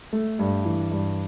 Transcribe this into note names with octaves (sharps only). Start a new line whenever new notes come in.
A3
G2
E3
G2